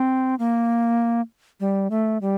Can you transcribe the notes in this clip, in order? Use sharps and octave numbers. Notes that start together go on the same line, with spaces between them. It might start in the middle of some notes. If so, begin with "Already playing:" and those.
Already playing: C4
A#3
G3
A3
G3